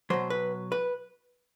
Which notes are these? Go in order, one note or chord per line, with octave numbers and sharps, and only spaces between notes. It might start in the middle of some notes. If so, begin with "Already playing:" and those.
B2 F#3 C5
B4
B4